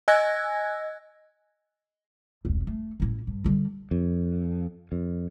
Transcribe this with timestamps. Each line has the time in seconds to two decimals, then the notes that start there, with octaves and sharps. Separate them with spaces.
0.08 D#5 G#5 E6 F#6 G#6 A#6
2.45 E1 C2
2.67 A3
3.00 A1 E4
3.27 G2
3.44 D3 G3
3.91 F2
4.92 F2